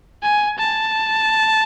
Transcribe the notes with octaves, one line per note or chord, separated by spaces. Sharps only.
G#5
A5